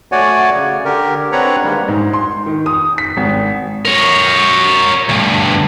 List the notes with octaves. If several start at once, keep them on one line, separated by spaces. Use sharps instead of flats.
A3 F#4 C#5 D5 F#5 G#5
C#3
D3 G4 A#4
C4 D4 B4 C#5 F#5 A#5
D#3 G3 G#3 A#3
G#2
C6
D#3
D#6
B6
G#1
A#4 C#5
D2 G2